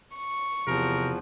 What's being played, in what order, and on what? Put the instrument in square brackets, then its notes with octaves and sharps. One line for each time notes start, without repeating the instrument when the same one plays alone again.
[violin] C#6
[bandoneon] E2 F3 [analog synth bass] C3 [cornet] A#4